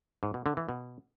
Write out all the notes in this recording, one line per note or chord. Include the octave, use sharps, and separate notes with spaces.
G#2
B2
D3
E3
B2